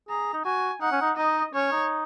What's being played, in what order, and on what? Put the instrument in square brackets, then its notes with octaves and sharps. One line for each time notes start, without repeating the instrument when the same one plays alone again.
[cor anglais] G#4 [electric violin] A#5
[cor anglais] D#4
[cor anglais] F#4 [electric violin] G#5
[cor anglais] D#4 [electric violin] F#5
[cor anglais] C#4
D#4
[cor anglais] D#4 [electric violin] D#5
[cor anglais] C#4 [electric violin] C#5
[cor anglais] D#4